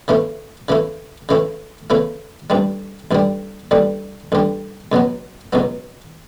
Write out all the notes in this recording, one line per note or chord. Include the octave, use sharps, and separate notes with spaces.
C#3 E3 A3 C#4 E4
C#3 E3 A3 C#4 E4
C#3 E3 A3 C#4 E4
C#3 E3 A3 C#4 E4
A1 G2 D3 G3
A1 G2 D3 G3
A1 G2 D3 G3
A1 G2 D3 G3
C#2 B2 F#3 B3
C#2 B2 F#3 B3